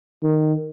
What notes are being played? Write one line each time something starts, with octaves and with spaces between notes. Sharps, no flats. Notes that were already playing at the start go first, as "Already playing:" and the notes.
D#3